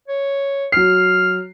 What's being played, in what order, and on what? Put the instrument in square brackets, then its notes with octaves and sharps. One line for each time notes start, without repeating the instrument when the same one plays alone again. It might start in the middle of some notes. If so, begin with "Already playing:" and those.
[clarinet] C#5
[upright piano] F#3 C7 [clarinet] F6